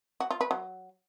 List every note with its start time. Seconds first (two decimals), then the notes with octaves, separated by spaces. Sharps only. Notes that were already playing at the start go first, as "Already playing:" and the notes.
0.20 F#4
0.31 F4
0.41 B4
0.51 F#3